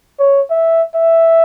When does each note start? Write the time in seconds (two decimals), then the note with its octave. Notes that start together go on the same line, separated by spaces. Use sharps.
0.19 C#5
0.50 E5
0.96 E5